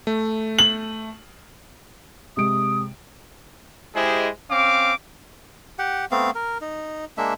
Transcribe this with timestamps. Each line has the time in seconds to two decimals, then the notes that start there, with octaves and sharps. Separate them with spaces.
0.07 A3
0.59 F#7
2.37 C3 G#3 D#6 D7
3.95 G#3 E4 G4 G#4 C5 D#5
4.50 C4 C#4 F5 D6
5.79 G4 F#5
6.11 A3 B3 C4 F5
6.35 A#4
6.61 D#4
7.18 G#3 A#3 D4 E5